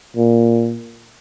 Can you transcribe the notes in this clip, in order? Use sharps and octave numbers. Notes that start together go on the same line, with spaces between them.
A#2